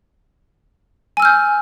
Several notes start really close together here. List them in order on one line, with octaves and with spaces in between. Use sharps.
G#5 E6 F6 G6